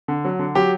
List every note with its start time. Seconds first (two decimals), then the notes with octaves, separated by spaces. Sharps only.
0.08 D3
0.25 F#3
0.39 D3
0.55 F#3 G4